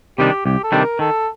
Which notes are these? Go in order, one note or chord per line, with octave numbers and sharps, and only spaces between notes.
C3 D#3 G3 D4 G4
C2 G4
A4
C3 D#3 G3 D4
A#4
D#3 A4